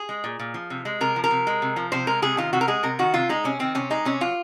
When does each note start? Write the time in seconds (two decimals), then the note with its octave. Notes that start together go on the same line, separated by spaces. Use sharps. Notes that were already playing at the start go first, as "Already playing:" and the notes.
Already playing: G#4
0.09 G#3
0.24 A#2
0.39 A#2
0.54 F3
0.70 C3
0.85 G#3
1.01 C3 A#4
1.16 F3
1.24 A#4
1.31 C3
1.47 G#3
1.62 C3
1.76 F3
1.92 C3 C5
2.07 G#3 A#4
2.22 C3 G#4
2.37 D#3 F4
2.53 C3 F#4
2.61 A#4
2.68 G#3 G#4
2.83 C3 A#4
2.99 D#3 F#4
3.14 C3 F4
3.29 G#3 D#4
3.44 C3 C#4
3.59 D#3 C4
3.75 C3 C#4
3.90 G#3 D#4
4.05 C3 C#4
4.21 F#3 F4